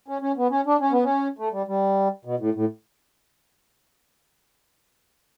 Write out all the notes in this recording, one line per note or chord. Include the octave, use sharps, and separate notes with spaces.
C#4
C#4
B3
C#4
D4
C#4
B3
C#4
A3
G3
G3
B2
A2
A2